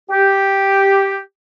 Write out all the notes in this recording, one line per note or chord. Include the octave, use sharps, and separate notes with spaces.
G4